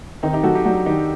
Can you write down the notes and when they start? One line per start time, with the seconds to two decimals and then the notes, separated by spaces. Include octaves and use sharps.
0.23 D#3 C4 D#4
0.33 D#4 G4
0.43 F#3 F#4 A4
0.55 D#4 G4
0.65 F#3 D4 F#4
0.86 D#3 D#4 G4